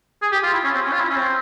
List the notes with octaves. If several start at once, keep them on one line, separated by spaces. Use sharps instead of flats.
G#4
G4
F4
E4
C#4
C4
C#4
F4
E4
C#4
C4